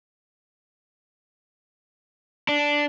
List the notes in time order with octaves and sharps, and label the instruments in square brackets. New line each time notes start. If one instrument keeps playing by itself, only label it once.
[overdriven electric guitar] D4